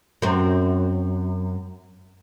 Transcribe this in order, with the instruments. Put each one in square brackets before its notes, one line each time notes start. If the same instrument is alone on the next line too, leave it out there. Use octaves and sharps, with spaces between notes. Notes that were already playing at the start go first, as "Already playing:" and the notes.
[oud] F#2 C4